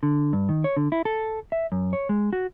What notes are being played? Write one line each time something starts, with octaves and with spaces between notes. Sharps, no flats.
D3
G2
D#3
C#5
D3
E4
A4
E5
F#2
C#5
G#3
F#4